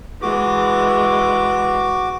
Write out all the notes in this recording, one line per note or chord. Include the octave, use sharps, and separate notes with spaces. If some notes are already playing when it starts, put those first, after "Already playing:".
E3 G#3 F#4 D6